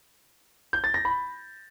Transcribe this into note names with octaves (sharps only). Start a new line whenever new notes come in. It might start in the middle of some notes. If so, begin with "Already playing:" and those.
G6
A6
A#6
B5